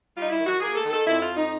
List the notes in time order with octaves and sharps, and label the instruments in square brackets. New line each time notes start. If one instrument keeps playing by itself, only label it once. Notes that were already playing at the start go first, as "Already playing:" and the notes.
[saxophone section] G3 F4
D#4
E4
D#3
F#4
A#3 G#4
A4
D#3
A4
F2 E4
F4
F2
D#4